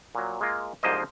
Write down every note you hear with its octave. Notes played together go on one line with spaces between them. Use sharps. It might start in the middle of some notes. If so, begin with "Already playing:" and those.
A#2 F#3
G#3 A#3 F4
C2 G#2 F3 A#3 C5 D#5